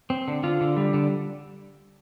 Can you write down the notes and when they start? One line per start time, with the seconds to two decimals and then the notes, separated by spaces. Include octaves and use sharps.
0.10 C4
0.28 D3
0.43 D3 F4
0.61 D3
0.76 G3
0.94 D3